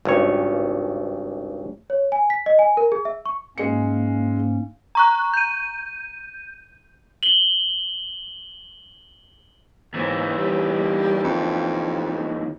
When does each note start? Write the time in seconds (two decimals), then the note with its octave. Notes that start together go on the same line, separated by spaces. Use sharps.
0.05 G#1 C#2 G2 C#5
1.90 C#5
2.12 G#5
2.30 B6
2.46 D#5
2.59 G#5
2.77 A#4
2.92 G#4
3.05 E5
3.26 C#6
3.58 G#2 G#3 A#3 C#4 C#7
4.95 A#5 C#6 F#6
5.33 G6 D#7
7.23 F#7 G7
9.94 D#2 G#2 E3
10.37 G3
11.24 F2